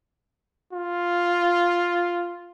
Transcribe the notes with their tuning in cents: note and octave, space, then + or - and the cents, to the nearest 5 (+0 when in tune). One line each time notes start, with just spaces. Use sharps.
F4 +0